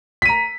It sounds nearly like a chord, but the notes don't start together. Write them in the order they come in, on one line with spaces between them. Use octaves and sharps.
B6 D#7 A#5